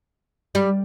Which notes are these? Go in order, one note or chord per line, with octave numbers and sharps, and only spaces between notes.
G3